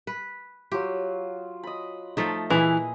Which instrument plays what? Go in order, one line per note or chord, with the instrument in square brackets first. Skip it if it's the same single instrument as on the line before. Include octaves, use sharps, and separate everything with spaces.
[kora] B4
[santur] F#3 F4 [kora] G4
[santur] D#5 B5
[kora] F3 A3 D#4
[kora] A#2 E4 [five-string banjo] E3 [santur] G#4 D#5 D#6